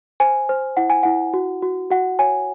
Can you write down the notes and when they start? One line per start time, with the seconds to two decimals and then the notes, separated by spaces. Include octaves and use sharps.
0.20 C5 G#5
0.49 C5
0.77 E4 F#5
0.90 G#5
1.03 E4 F#5
1.34 F#4
1.62 F#4
1.91 F#4 F#5
2.19 C#5 G#5